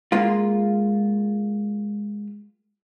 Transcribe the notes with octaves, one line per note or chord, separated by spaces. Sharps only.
G#3 A#3 F4